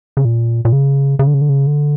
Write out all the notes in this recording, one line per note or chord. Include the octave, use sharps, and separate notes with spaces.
C#3
A#2
A#2
C#3
C#3
D3
C#3
D3
C#3
D3